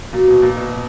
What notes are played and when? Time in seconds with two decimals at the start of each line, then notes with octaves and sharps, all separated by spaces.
0.13 A#2 F#4
0.28 B2
0.42 A#2
0.57 B2
0.72 B2